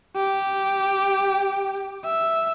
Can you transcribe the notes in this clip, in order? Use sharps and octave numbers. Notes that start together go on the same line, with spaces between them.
G4
E5